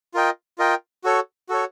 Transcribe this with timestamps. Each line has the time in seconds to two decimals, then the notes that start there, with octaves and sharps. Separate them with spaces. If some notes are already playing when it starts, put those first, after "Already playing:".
0.14 F4 A#4 D#5 G5
0.58 F4 A#4 D#5 G5
1.04 F#4 A4 C#5
1.49 F#4 A4 C#5